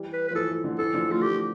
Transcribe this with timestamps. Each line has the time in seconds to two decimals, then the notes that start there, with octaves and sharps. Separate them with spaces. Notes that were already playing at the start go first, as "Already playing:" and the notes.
Already playing: E3 G3
0.13 B4
0.28 B4
0.31 F3
0.35 E3 A4
0.50 E3
0.64 D3
0.78 E3 A4
0.93 D3 F3
1.08 F3 A3 F4
1.22 G4